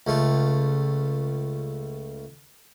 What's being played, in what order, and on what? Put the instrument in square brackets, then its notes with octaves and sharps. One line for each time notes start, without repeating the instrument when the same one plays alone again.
[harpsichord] C#2 A3